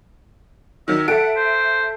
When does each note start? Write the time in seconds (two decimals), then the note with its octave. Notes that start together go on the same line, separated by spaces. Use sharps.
0.88 D#3 F#3 E5
1.08 A4 E5 F#5 D7
1.36 C5